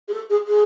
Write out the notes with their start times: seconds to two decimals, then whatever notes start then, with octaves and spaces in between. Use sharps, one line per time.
0.08 G#4
0.13 A4
0.30 G#4
0.46 G#4